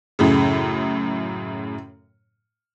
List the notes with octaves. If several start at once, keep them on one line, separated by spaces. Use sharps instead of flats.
F#2 A2 C#3